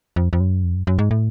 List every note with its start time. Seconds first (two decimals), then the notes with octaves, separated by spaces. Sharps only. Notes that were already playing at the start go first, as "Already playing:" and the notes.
0.16 F2
0.33 F2
0.40 F#2
0.64 F2
0.75 F#2
0.87 F#2
0.99 G#2
1.11 A2